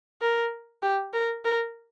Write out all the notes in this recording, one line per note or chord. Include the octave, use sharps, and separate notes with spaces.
A#4
G4
A#4
A#4